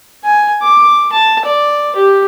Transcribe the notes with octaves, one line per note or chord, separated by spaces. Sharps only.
G#5
D6
A5
D5
G4